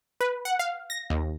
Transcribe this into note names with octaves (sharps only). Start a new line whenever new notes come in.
B4
F#5
F5
A#6
D#2